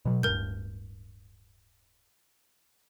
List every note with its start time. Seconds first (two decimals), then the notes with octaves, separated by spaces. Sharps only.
0.05 B2 F#3
0.23 D1 G2 A#4 G6